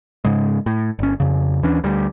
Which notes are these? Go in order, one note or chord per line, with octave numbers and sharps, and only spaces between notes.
G#2 C#3 G#3
A2
G1 C#4
F2 C#3
D#2 E3 C#4 D4
D2 G3